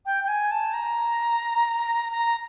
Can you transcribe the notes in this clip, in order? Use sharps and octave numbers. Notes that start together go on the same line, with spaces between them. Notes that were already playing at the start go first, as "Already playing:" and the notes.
G5
G5
G#5
A5
A#5
A#5